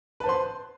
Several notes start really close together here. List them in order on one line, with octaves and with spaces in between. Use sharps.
B4 A5 C5 C6